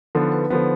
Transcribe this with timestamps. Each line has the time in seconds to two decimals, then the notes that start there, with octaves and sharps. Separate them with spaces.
0.15 D3 F3 B3 D#4
0.32 B4
0.50 D3 F3 B3 C5